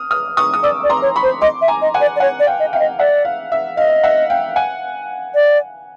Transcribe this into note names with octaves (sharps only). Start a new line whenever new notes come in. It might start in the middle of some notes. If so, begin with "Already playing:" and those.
Already playing: D#6 F6
D#6 F6
C#6 D#6
D#6
D5 D6 E6
D5
A#5 C6
C#5
B5 C#6
C5
D#5 C6 D6
E5
G#5 A#5
D#5
F#5 G#5
D5
D5
C#5 F#5 G#5
D5
F5 G5
D#5
E5 F5 G5
D#5
D5 E5 F#5
F5
E5
D#5 F5
E5 F#5
F5 G5
F#5 G#5
D5